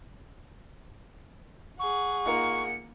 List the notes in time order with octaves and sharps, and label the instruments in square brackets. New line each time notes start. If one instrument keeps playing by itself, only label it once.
[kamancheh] G#4 F#5 [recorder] C#6
[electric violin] A#3 C#7 [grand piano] D#4 F4 A#4